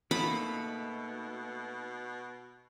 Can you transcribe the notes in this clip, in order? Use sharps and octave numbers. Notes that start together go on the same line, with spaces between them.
B2 A3 A#3 D#4 B5